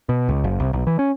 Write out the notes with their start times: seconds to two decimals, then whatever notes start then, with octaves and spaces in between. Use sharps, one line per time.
0.09 B2
0.29 C#2
0.44 F#1
0.60 C2
0.73 B1
0.87 E3
0.99 C#4